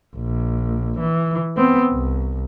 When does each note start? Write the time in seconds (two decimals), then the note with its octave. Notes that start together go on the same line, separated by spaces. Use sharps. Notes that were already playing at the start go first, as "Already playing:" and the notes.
0.16 A#1
0.99 E3
1.57 B3 C4
1.92 C2